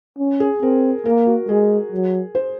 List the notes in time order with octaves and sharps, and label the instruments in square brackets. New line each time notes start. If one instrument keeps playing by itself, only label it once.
[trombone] C#4
[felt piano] G#4
[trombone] C4 [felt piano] A#4
[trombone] A#3 [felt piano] A#4
[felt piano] F#4
[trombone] G#3 [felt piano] G#4
[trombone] F#3
[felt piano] C5